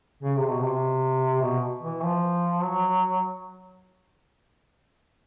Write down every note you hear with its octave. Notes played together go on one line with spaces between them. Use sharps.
C#3
C3
B2
C3
B2
E3
F3
F#3